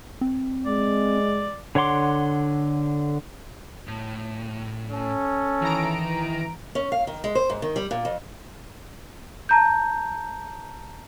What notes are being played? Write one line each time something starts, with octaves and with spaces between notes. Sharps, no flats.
C4
G#3 D5
D3 C#5 F#5 C6 D6
A2
C#4 A4
D#3 E3 A#5 D7
C#4
F5
D#3
G#3
C5
G#2
D#3
G3
A#2
F2
A5 A#5 G6